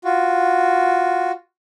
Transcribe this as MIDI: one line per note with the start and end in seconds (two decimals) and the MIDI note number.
0.04 1.31 65
0.04 1.31 66